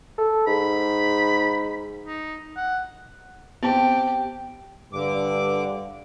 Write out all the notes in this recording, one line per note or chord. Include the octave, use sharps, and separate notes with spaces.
A4
G#2 B5
D#4
F#5
B3 C4 G4 A5
G2 D3 D6